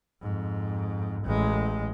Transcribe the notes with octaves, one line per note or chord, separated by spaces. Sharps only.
F2 G#2
A1 G#3